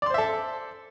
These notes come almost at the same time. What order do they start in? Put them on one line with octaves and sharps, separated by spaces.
D5 C6 C5 E5 A4